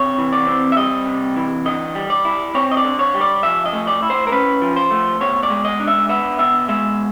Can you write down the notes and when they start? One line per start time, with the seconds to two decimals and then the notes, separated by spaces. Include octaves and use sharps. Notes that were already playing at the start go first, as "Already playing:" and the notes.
Already playing: C3 C#5
0.18 E3
0.33 D5
0.47 C4
0.72 E5
0.77 G3 D#5
1.06 C3
1.36 E3
1.66 D3 D#5
1.95 G3
2.10 D5
2.25 E4
2.55 C4 C#5
2.72 D#5
2.77 D5
2.84 D3
2.99 C#5
3.14 G3
3.21 D5
3.43 F3 E5
3.66 D#5
3.73 A3
3.87 D5
4.02 E4
4.10 C5
4.27 A#4
4.32 C#4 B4
4.62 F3
4.76 C5
4.91 A3
5.21 B2 C#5
5.43 D5
5.50 G#3
5.65 D#5
5.80 D4
5.87 E5
6.09 B3 E5
6.39 B2 E5
6.68 G#3 E5